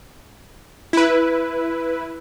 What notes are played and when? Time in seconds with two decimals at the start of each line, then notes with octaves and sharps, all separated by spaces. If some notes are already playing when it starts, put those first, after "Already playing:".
0.93 E4 B4